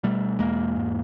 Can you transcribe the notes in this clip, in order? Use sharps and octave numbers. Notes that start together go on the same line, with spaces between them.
B2 G3 A3
E2 G#3 A#3
G#2